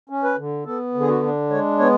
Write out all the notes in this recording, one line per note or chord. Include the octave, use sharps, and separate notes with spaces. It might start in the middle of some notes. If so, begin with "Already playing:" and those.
C#4
B4
D3
B3 A4
D3
G#4
F#4
D4
G#3 C#5
B3 C#5